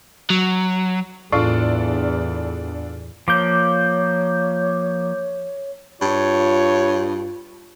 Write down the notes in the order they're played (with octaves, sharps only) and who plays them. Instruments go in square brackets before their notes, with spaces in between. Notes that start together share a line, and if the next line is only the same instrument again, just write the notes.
[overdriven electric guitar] F#3
[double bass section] E2 [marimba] A2 [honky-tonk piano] D4 F4 A4
[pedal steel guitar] F3 A#3 [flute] C#5 [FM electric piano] D6 G6
[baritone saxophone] G2 [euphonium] F4 [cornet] C#5